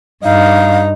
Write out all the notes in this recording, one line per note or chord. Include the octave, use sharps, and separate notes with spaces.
G2 D#4 F5